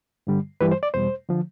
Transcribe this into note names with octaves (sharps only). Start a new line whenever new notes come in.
G2 D3 G3
G2 E3 G3 B4
C5
D5
E2 B2 G3 C5
D3 F3